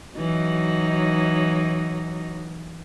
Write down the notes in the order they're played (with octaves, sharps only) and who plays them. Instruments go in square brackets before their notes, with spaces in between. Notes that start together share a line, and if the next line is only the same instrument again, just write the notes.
[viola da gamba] E3 F#3 D#4